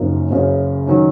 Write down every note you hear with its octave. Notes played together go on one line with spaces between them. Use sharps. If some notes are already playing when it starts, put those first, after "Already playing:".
Already playing: F#1 F#2 F3 A#3 D#4
F#1 F#2 C#3
D#3 F#3 C#4